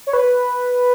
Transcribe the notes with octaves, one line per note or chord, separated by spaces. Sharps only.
C#5
B4